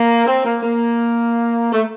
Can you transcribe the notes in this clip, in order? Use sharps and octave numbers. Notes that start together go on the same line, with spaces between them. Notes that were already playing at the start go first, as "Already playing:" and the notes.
Already playing: A#3
C4
A#3
A#3
A3